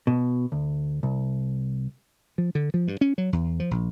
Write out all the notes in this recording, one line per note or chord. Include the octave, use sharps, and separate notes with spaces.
B2
D2
C2
F3
D3
F3
G2
C#4
F#3
E2
F3
A#1